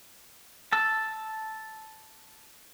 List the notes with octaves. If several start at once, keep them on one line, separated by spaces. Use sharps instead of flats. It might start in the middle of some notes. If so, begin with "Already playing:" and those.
A5 E6